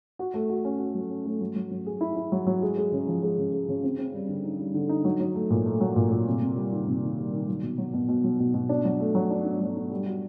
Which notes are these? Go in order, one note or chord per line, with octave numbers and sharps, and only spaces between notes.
F#4
A3
F#4
C#4
F#4
F#3
C#4
A3
F#3
F#3
F#3
G#4
E4
E4
F#3
F#3
G#3
G#3
C#3
F3
G#3
C#3
G#3
C#3
C4
C4
G3
D3
D#4
G3
D3
D#4
F#3
F#3
A3
A#2
A3
F#3
A#2
A#2
C3
C3
G3
D#3
C3
D#3
G3
D#3
F#3
B2
F#3
B2
B2
F#3
B2
B2
D4
F#3
A3
F#3
D4
D4
F#3
D4
G3
F#4